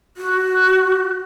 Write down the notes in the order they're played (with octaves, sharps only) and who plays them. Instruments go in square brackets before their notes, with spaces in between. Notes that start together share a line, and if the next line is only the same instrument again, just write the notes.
[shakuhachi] F#4